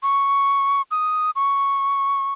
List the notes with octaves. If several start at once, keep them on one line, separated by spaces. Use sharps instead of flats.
C#6
D#6
C#6